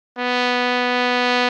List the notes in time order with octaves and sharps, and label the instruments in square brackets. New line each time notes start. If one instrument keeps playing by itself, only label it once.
[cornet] B3